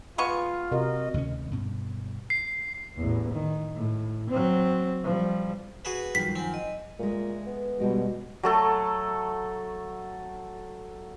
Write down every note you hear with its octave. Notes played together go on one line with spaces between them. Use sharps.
G#3 B3 F4 C#6
C3 F#4 A#4 D#5
D2 C3 D#3 C#4
G2 B2
C7
A1 E2
D#3
A2
F#3 C4
F3 G3
F#4 G#4 B4
F#2 D#3 F3 G3 B6
C4 F#5 G#5
D#5
A#2 G#3 A3
B3
B2 G3 G#3
F#3 A3 A4